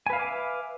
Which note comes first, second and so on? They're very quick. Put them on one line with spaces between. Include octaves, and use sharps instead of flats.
G#5 B4 F5 E5 D6